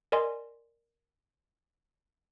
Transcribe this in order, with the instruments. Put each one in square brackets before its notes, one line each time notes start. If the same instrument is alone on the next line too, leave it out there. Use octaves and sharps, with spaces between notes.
[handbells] A#4 D5 D#5 G#5 C6